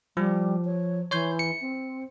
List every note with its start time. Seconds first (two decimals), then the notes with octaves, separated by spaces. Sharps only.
0.17 F3 G3
0.65 C#5
1.11 E3 C#5 C6 G6
1.39 C#7
1.61 C4